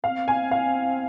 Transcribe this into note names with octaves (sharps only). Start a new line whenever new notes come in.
C4 F5
G#5
F5